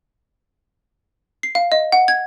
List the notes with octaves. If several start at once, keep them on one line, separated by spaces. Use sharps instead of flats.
C7
F5
D#5
F#5
G#6